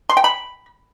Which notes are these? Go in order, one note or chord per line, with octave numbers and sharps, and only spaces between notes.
C6
G5
B5